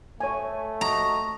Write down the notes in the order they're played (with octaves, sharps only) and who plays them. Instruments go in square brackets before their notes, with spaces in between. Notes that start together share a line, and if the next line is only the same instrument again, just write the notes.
[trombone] A3 [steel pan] C#5 G#5
[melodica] F#4 D#5 [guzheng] A#5